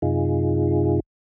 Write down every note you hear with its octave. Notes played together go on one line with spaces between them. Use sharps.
F#2 C3 D#4 F4 G#4